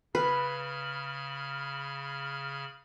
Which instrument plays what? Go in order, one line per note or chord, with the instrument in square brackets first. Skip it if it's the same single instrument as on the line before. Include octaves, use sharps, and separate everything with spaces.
[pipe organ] C#3 B5 F6 [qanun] B4